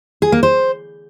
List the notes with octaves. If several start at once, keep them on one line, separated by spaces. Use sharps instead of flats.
G#4
A#3
C5